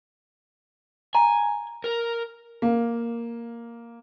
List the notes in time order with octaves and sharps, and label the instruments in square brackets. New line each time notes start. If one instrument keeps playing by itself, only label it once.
[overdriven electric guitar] G#5 [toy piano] A#5
[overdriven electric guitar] A#4
[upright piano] A#3